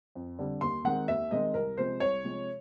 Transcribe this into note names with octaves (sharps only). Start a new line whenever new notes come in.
F2
D3 G3 C4
D#2 C6
D#3 G#3 C4 F#5
D#2 E5
D#3 G#3 C4 D#5
C2 A#4
C3 F3 G#3 C5
C2 C#5
C3 F3 G#3